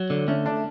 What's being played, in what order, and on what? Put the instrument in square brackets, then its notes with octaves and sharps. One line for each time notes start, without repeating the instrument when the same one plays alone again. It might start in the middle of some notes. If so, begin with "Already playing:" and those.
Already playing: [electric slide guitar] F#3
D3
[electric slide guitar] A3 [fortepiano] C#4
[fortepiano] D4